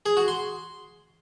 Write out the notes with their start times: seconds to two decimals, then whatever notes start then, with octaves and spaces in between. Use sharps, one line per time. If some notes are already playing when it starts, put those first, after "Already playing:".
0.06 G#4
0.17 F#4
0.28 C6